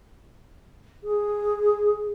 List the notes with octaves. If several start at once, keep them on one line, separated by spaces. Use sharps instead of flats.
G#4